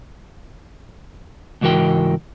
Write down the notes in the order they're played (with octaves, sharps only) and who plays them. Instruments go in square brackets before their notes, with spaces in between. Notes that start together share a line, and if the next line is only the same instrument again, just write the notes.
[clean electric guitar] C#2 G#2 E3 F#4 A#4 G5